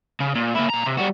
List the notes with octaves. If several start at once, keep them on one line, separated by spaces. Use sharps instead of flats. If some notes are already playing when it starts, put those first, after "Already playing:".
C#3
A#2
A#3 E4
A#2 A#5
C3
G3 F#4